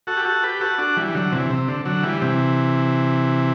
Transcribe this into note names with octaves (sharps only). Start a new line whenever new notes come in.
F#4 A4
G4
F#4 A4
G4 B4
F#4 A4
D4 F#4
E3 G3
G3
D3 F#3
C3 E3
C3
D3
D3 F#3
E3 G3
C3 E3